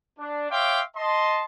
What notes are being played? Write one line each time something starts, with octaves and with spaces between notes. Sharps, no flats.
D4
C#5 E5 F5 G5 C6 D6
D#5 A5 C6